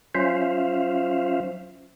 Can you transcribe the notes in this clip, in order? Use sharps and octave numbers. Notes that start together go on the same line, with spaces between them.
F#3 C#4 F4 C5 E5 F5